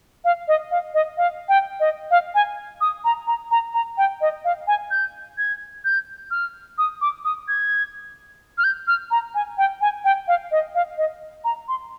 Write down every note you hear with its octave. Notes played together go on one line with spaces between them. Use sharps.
F5
D#5
F5
D#5
F5
G5
D#5
F5
G#5
D#6
A#5
A#5
A#5
A#5
G5
D#5
F5
G#5
G6
G#6
G6
F6
D#6
D6
D#6
G#6
F6
G6
F6
A#5
G#5
G5
G#5
G5
F5
D#5
F5
D#5
A#5
C6